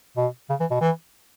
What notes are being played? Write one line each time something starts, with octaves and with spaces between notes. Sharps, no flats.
B2
C#3
E3
B2
E3